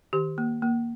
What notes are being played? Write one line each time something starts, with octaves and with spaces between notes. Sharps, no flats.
D#3 G4
A#3
A#3